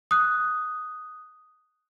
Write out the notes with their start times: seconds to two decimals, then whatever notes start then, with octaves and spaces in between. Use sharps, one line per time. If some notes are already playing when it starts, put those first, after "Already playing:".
0.11 D#6 F#6